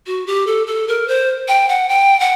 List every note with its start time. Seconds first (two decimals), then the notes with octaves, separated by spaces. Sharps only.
0.07 F#4
0.27 G4
0.47 A4
0.67 A4
0.88 A#4
1.08 C5
1.48 G5
1.69 F#5
1.89 G5
2.20 F#5